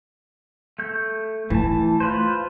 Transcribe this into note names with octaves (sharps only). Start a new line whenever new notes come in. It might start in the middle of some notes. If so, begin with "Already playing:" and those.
A3 G6
E3 A3 A5
F4 B4 C5